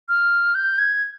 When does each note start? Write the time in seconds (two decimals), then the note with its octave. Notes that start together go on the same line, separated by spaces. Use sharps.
0.09 F6
0.55 G6
0.79 G#6